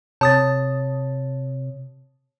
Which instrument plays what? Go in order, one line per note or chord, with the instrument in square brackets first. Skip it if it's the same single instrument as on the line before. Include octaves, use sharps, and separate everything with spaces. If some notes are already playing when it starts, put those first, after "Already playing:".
[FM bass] C3 [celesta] C#5 [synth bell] A5 D#6 A6